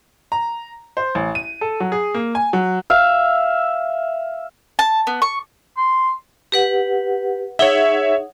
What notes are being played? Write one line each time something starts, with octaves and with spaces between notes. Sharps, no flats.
A#5
C5
A1
D#7
A4
F#3
G#4
A#3
G#5
F#3
E5 F5
A5
B3
C#6
C6
G4 B4 F#5
D#4 G#4 C#5 E5 F#5